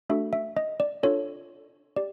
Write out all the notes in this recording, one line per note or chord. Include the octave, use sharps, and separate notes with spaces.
A3 D4 F#4 A4 E5
E5
D#5
D5
D4 F4 A4 C#5
G4 D5